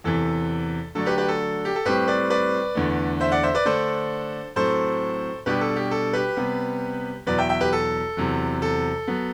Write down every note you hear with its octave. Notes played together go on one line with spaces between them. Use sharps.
E2 C3 E3 A4
D3 F#3 A3 D4 A4
G4 B4
G4 B4
A4
G4
A4
A2 G3 C4 G4 B4
B4 D5
B4 D5
E2 D3 A3
C5 E5
D5 F#5
C5 E5
B4 D5
D3 A3 D4 A4 C5
A2 F#3 C4 A4 C5
B2 G3 D4 G4 B4
A4
G4
A4
G4 B4
C3 G3 B3
E2 B2 F#3 B4 D5
E5 G5
E5 G5
G4 B4
A4
E2 C3 F#3
A4
F#3 B3